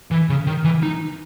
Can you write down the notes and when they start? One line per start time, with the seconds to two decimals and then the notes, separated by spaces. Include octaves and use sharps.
0.11 E3
0.29 C#3
0.47 D#3
0.64 E3
0.83 D#4